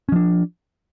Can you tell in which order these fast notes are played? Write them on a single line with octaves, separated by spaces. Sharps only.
C#4 F3 D4